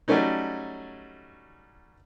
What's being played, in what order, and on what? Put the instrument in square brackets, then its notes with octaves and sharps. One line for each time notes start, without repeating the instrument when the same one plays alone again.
[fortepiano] F#3 G3 A3 C#4 D#4